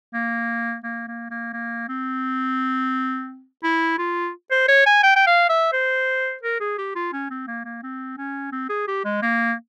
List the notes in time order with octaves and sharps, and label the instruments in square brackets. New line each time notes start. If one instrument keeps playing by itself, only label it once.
[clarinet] A#3
A#3
A#3
A#3
A#3
C4
E4
F4
C5
C#5
G#5
G5
G5
F5
E5
C5
A#4
G#4
G4
F4
C#4
C4
A#3
A#3
C4
C#4
C4
G#4
G4
G#3
A#3